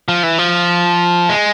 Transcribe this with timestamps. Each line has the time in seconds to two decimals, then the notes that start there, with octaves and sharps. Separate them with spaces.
0.08 F3
0.23 E3
0.38 F3
1.29 G#3